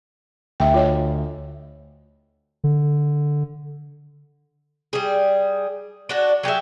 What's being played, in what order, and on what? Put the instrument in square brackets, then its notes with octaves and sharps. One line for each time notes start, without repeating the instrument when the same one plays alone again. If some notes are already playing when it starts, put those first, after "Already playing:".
[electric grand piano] D2 [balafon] E5 G5
[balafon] F4 C#5 D#5
[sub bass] D3
[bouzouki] G3 G#4
D4 F#4 C#5
F#3 G4 G#4 E5